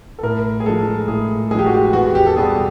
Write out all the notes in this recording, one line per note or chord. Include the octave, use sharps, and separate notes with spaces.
A4
A2 A#4
G#4
F3 G#3 A4
A2 G#4
F3 G#3 G4 G#4
F#4
G4
E2 F#4
G4
A4
B2 G3 G#4